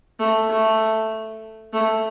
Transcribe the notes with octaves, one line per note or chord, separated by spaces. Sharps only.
A3
A3
A3